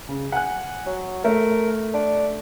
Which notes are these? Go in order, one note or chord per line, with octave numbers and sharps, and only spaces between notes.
C#3
F#5 G#5 F#6
F#3
A3 A#4
D4